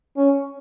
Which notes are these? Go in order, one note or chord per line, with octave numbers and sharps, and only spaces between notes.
C#4